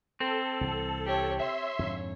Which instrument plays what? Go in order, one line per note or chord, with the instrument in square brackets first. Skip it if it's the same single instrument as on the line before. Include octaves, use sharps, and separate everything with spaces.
[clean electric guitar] C4 [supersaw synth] A4
[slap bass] C2 E3
[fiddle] G4 C#5
[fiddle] C#5 [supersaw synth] E5 C6
[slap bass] F2 G#2 D3